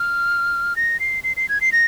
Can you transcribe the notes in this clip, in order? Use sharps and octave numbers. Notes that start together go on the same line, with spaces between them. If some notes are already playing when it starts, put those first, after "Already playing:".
Already playing: F6
A#6
C7
C7
C7
G#6
C7
A#6